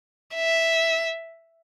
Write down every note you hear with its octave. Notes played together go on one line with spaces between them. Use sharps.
E5